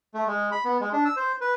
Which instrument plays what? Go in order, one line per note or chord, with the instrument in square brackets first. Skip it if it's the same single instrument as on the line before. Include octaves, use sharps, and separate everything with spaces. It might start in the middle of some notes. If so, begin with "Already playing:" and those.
[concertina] A3
G#3
B5
B3
G#3
D4
E6
C5
B4